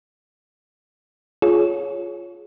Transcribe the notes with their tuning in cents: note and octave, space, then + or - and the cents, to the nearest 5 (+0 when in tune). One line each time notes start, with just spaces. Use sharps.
F4 +0 G#4 +15 C#5 +0